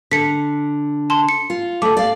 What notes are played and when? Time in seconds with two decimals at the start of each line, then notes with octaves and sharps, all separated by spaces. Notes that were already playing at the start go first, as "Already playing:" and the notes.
0.11 D3 B6 C#7
1.10 A5 C6
1.29 C#7
1.50 F4
1.82 A3 A4 D6
1.97 D5 F5